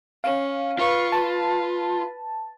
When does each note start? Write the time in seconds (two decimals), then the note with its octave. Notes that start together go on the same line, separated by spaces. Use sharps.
0.24 C#4 F5
0.79 F4 B4 C#6
1.12 B4 A5